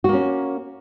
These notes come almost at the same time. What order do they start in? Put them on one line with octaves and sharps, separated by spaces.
F#4 A#3 C#4